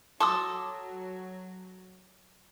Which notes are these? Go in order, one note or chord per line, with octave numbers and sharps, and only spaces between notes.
F#3 A4 C6 D6 D#6